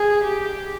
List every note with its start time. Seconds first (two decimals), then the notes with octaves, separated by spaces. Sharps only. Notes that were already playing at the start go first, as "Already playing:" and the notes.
Already playing: G#4
0.24 G4